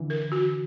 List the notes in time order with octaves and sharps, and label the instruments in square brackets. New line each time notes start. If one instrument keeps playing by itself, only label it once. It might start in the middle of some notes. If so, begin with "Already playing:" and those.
Already playing: [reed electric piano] D3 E3
[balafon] A#4
F#4